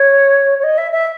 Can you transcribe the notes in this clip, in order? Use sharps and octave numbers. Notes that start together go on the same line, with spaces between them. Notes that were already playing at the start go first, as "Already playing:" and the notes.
Already playing: C#5
C#5
D#5
E5
E5